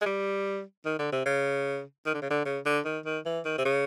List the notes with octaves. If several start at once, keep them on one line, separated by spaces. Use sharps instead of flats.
G#3
G3
D#3
D3
C3
C#3
D#3
D3
C#3
D3
C#3
D3
D#3
D#3
E3
D#3
C3
C#3